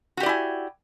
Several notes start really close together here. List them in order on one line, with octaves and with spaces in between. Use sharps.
F#4 G4 D5 E4 G#5